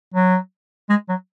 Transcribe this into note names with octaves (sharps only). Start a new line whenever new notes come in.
F#3
G#3
F#3